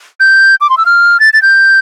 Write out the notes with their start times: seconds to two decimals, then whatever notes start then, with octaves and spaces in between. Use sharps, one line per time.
0.20 G6
0.61 D6
0.70 C6
0.78 E6
0.86 F6
1.20 A6
1.33 A6
1.42 G6